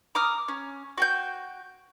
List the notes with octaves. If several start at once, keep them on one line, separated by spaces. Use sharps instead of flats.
A#5 D6 D#6 F6
C#4
F#4 G5 G6